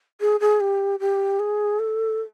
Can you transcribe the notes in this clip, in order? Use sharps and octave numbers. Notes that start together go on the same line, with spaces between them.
G#4
G#4
G4
G4
G#4
A4